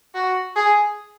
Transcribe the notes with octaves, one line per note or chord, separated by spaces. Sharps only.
F#4
G#4